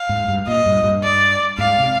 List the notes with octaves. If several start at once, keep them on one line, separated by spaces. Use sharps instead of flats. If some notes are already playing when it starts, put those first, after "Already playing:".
Already playing: F5
G#2
G2
A#2 D#5
G2
G2
D5
G#2 F5
C3